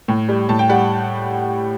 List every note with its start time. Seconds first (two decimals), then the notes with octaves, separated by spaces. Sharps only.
0.08 A2
0.29 G3
0.49 A2 A5
0.59 G5
0.69 G3 F#5